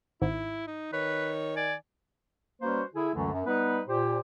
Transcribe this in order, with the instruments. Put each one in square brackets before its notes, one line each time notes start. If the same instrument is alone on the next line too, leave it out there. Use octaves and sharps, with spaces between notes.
[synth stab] G#1 [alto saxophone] E4
[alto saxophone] D#4
[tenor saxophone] D#3 [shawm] B4 [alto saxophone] C#5
[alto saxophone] D5 [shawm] G#5
[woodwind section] G3 A#3 C#4 F#4 B4 C5
D3 E4 G#4
C#2 F#2 D3 E3 F#3 A3
F#2
G3 B3 D#4 B4
A#2 G4 C5